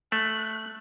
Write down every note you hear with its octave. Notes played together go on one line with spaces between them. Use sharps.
A3 F#6